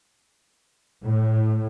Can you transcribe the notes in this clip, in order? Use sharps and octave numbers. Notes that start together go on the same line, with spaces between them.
A2